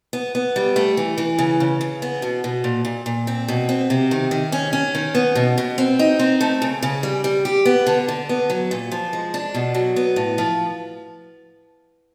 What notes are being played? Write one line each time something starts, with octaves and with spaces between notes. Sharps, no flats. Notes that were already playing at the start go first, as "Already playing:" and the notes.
B3
B3
G3
A3
E3
E3
C#3
C#3
C#3
B3
B2
B2
A#2
A#2
A#2
C4
B2
C4
C3
D#3
D#3
C#4
C#4
D#3
B3
B2
B2
C4
D#4
C4
A3
C#3
C#3
G3
G3
G4
B3
D3
D3
B3
F#3
A#2
F3
G#3
D4
B2
F#3
B3
A2
F3